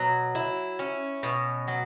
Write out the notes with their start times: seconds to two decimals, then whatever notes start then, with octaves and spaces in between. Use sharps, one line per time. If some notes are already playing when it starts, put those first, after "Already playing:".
Already playing: B2 F#3
0.35 E4
0.79 C#4
1.23 B2
1.68 F#3